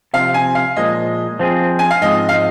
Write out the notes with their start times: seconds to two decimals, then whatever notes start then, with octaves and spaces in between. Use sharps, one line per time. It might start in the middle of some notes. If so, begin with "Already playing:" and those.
0.14 C3 F3 C4 F5
0.34 G#5
0.55 F5
0.76 A#2 F3 G#3 D#5
1.40 F3 C4 G#4
1.79 G#5
1.90 F5
2.02 G#2 F3 G#3 C4 D#5
2.29 F5
2.34 D#5